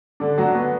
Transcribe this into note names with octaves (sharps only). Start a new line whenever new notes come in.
D3 D4
F#3 F#4
B3